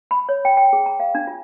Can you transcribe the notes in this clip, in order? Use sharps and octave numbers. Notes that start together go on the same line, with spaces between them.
B5
C#5
G5
G5
G#4
A#5
F5
D4
F4